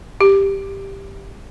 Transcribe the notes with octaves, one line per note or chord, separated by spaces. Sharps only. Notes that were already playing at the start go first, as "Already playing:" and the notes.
G4